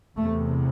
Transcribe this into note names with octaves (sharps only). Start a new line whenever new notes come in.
E2 C3 A3